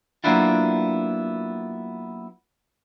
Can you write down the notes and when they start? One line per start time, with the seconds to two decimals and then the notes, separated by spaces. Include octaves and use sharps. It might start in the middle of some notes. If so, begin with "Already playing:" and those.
0.24 F#3 A#3 B3 D4 E4 F4